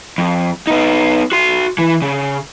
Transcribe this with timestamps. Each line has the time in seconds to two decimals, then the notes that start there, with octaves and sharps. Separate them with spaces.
0.18 F2
0.67 B3 D#4
1.32 F#4 C6
1.78 E3
2.02 C#3